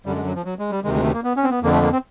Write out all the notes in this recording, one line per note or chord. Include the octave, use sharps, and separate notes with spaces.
F#2 D3 G3
G#3
F#3
F3
F#3
G#3
G3
D2 C3 D#3 G#3
G#3
A3
A#3
B3
C#4
C4
B3
F2 D3 A#3
A3
A#3
C4